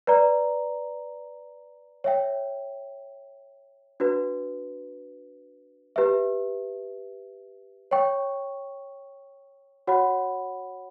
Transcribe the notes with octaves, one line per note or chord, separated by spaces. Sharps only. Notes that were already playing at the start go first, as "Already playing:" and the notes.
B4 D5 A#5
C#5 E5 G5
D4 F#4 B4
G4 B4 E5
C#5 G5 C#6
F#4 C#5 F#5 B5